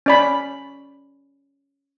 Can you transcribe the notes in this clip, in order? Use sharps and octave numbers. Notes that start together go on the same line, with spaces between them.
C#4 D5 B5